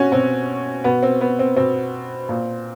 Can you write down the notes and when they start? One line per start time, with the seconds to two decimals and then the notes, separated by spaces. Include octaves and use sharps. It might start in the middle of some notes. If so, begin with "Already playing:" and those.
Already playing: B2 C#4 F#4
0.12 B2 C4
0.84 B2 B3
1.03 C4
1.21 B3
1.39 C4
1.57 B2 C4
2.29 A#2